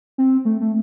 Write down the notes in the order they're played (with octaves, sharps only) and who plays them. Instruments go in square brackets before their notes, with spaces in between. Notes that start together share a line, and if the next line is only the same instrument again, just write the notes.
[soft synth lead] C4
A3
A3